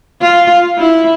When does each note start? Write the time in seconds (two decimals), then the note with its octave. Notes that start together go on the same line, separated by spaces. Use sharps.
0.21 F4
0.78 E4